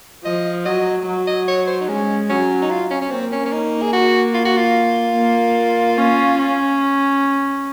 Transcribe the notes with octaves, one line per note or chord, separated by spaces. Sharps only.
F3 D#5
F#3 D#5
F#3
D#5
C#5
C5
D#4
G#3 C#4
F#3 C#4
D#4
F4
C#4
C#4
A#3 C4
C#4
C#4
D#4
G#4
F#4
F4
F#4
F4
A#3
C#4
C#4